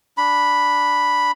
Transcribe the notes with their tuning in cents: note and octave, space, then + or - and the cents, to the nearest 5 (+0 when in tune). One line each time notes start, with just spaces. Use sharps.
D4 +0 B5 +0